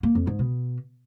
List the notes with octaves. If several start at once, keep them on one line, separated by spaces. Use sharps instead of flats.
A#3
F2
G#2
B2